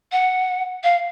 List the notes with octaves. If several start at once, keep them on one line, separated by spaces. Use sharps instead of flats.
F#5
F5